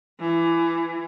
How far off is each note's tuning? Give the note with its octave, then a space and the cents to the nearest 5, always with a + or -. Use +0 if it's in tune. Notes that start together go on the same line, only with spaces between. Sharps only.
E3 +25